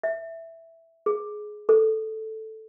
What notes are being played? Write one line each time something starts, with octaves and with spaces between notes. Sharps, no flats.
E5
G#4
A4